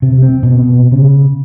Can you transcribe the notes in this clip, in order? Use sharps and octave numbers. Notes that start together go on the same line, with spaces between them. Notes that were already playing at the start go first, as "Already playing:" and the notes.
C3
C4
B2
C#3